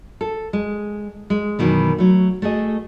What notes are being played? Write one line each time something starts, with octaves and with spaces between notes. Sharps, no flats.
A4
G#3
G#3
F#2 B2 D#3 E3
F#3 A3
A3 F#4 G#4 D#5